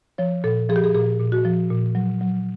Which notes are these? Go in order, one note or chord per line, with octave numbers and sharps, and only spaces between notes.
F3 C#5
A#2 A4
F3 G#4
G4
G#4
A#2 G#4
A#2
F#4
F3
A#2
F#3
F#3